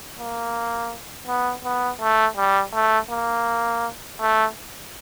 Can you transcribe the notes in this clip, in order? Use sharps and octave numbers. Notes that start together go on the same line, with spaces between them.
A#3
B3
B3
A3
G3
A3
A#3
A3